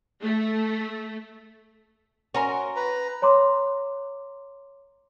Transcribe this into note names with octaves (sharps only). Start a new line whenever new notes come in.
A3
C#4 F#4 A#4 C6
B4 A#5
C#5 A#5 C6 D6